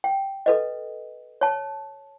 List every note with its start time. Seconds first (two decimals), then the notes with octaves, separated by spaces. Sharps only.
0.04 G5
0.46 A4 B4 D#5
1.41 C#5 A5